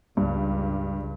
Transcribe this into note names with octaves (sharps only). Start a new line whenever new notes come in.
C#2 G2